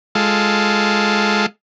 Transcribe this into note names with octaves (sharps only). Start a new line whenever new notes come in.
G#3 F4 A4